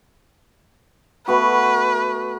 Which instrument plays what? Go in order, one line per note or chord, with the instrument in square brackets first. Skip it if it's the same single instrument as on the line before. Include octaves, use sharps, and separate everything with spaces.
[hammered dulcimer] A3 B3 F#4 [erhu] B4